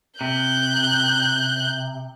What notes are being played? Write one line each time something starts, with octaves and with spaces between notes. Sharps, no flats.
C3 F#6 G6